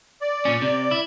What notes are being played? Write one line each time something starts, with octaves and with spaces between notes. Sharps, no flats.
D5
A#2 C#4
C3
E4